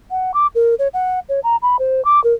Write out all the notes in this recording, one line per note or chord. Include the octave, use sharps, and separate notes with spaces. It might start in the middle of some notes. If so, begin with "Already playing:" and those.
F#5
D6
A#4
C#5
F#5
C#5
A#5
B5
C5
D6
A#4